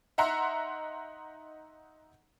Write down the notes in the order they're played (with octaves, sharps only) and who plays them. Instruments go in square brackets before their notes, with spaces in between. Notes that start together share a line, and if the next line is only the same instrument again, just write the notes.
[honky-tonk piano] D#4 E5 F#5 A#5 C6